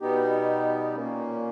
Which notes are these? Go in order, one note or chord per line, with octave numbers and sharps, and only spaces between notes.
B2 G3 B3 D#4 G4
A#2 A#3 C#4